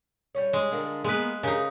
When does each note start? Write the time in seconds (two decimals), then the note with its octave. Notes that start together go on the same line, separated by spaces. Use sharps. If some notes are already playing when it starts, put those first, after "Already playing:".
0.35 G3 C#4 C#5
0.53 G#3
0.72 D3 F4 A#4
1.04 G#3 A#3 B3 G#4 B4
1.43 C#3 D#4 G4 G#4 A#4